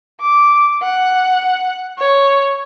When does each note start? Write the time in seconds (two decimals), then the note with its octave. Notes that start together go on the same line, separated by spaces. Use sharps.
0.21 D6
0.83 F#5
1.99 C#5